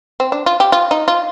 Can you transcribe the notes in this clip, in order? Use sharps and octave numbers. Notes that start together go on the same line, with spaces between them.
C4
D4
F4
G4
F4
D#4
F4